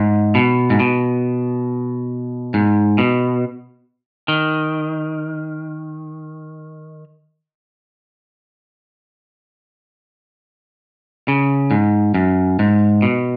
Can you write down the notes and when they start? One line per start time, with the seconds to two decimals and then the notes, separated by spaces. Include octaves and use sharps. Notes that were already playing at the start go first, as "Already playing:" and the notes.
Already playing: G#2
0.35 B2
0.70 G#2
0.80 B2
2.54 G#2
2.98 B2
4.28 D#3
11.28 C#3
11.71 G#2
12.14 F#2
12.59 G#2
13.02 B2